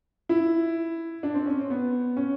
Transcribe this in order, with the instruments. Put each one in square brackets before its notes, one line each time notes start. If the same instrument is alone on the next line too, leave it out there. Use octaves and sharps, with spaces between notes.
[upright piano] E4
D4
C4
C#4
C4
B3
C#4